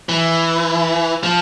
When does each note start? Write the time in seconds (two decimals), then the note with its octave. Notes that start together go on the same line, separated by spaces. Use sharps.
0.09 E3
1.23 F3